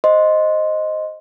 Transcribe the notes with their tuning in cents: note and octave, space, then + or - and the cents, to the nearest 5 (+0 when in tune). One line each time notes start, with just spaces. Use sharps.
C5 +0 D#5 +0 C6 +0